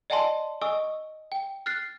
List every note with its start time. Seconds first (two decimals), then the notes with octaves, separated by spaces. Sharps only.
0.10 D5 D#5 F#5 G#5 A5 C6
0.61 D#5 G#5 C#6 D#6 E6
1.32 G5
1.66 F6 F#6 A6 C7